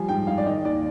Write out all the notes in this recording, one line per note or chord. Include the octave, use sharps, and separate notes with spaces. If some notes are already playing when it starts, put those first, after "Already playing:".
Already playing: F3 G3 G#5
G#2 G5
G#2 F5
D5
D#3 D#5
D#2 D5